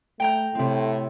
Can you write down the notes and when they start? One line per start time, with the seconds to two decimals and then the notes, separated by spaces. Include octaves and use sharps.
0.20 A3 G5 A#5 G6
0.55 A2 C3 C4